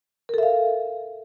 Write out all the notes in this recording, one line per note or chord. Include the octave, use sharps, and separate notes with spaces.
A4 A#4 E5 F5